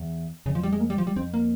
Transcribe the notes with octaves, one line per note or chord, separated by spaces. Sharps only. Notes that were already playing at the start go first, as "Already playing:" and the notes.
Already playing: E2
F2 C#3
F3
G3
G#3
A#3
G3
F3
G3
F2 C4
A#3